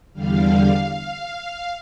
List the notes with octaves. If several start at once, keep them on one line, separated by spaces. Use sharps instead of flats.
E2 D3 G3 F5
F5